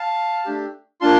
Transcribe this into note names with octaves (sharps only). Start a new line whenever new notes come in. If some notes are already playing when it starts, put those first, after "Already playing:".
Already playing: F5 A5
A3 D4 G4
A#3 D4 F4 A5 C6